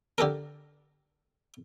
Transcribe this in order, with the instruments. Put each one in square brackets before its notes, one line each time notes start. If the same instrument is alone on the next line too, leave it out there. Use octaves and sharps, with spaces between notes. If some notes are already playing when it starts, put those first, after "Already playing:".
[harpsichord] D3 G4 A4 A#4